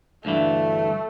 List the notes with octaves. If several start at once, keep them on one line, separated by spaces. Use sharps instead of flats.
D2 G2 E3 A3